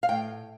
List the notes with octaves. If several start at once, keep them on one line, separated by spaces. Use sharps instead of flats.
F5
A2 G5